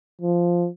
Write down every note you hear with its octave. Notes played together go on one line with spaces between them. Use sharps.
F3